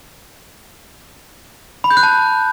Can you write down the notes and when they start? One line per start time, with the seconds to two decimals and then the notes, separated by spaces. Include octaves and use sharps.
1.84 B5
1.91 G6
1.97 F#6
2.03 A5